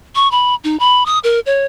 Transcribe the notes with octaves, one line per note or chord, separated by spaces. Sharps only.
C#6
B5
D#4
B5
D#6
A#4
C#5